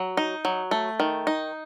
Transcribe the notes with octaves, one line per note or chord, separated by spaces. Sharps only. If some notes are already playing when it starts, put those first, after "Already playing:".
Already playing: F#3
D#4
F#3
A3
D#3
D#4